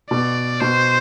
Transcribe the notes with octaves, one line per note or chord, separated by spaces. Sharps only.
B2 D5
B2 C5